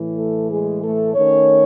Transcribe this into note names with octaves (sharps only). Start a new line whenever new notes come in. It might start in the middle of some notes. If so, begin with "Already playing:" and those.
Already playing: A2 E3
A3 A4
G#3 G#4
A3 A4
D#3 A3 C#4 C#5